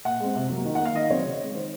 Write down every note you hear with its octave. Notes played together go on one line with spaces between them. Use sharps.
A#2 F#5
G#3 C4
C3
F#3 A#3
D#3
F#5
A#3
F5
D#3 D#5
F#3 C4 C#5
C#3
G#3 C4
D#3 C5